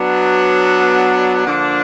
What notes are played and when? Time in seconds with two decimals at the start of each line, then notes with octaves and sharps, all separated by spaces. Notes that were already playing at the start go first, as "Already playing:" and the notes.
Already playing: F#3 B3 D4
1.47 D3 F3 A#3 D4